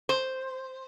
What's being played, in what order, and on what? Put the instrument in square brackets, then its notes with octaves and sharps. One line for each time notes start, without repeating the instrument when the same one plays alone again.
[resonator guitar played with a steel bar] C5